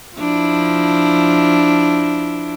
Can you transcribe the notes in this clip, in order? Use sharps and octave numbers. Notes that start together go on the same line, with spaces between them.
F3 D4 E4